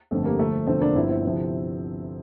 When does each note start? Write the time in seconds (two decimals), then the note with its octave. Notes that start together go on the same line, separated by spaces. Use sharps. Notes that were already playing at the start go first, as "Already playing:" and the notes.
0.11 G1 F2 D3 A3
0.25 G3 A#3
0.39 D2 D3 F3 A3
0.67 E1 D2 D3 F3 A3 C4
0.81 A#3 D4
0.95 G1 G2 D3 F3 C4 E4
1.09 C4 E4
1.24 D2 C3 F3